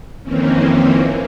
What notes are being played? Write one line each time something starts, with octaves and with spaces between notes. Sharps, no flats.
F2 D#3 E3 A#3 C4 C#4